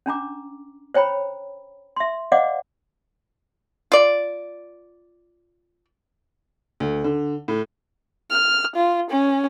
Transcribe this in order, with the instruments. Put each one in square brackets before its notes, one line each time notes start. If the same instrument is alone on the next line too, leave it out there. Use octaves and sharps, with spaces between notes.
[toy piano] C#4 D4 A#5 D6
C5 C#5 G5 A#5 B5
E5 C6
C5 D5 D#5 F5 F#5 D6
[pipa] F4 D5
[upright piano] D2
D3
A2
[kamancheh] F6
F4
C#4